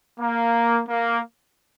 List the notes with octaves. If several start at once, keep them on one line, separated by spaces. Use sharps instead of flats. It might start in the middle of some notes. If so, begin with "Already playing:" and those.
A#3
A#3